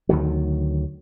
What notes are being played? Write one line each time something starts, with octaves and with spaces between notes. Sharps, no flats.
D2 D#3 F#3